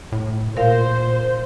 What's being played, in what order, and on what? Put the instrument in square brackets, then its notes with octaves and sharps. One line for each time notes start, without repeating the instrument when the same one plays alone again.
[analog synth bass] A2
[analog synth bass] A#2 [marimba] A#4 F5 [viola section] C5